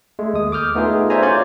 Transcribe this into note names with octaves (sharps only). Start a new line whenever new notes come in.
G#3 A3
D#2 D#6
D6 D#6 F6 G6
A3 B3 D#4 F4 G#4
C5 D5 E5 F5 G#5 A#5
C#4 F4 F#4 D5 G#5 G6